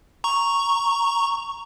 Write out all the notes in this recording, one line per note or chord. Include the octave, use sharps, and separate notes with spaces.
A#5 C#6